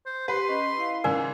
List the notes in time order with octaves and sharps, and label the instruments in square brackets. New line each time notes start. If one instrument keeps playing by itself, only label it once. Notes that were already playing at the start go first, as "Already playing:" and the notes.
[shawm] C5
[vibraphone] G4 [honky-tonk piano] B4 [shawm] C6
[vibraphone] C#4 D#5
E4 F5
[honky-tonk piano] G#2 C#3 [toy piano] A#4 D5 G#5